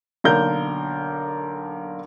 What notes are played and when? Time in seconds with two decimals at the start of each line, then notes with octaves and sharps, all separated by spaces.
0.24 B1 D3 A#3 A#4 G6